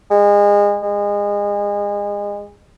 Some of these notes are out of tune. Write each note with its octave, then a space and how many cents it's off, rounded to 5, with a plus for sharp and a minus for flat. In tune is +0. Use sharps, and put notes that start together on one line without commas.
G#3 -30
G#3 -30